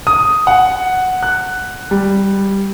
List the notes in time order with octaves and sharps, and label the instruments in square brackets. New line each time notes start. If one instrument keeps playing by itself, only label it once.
[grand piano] D#6
F#5
F#6
G3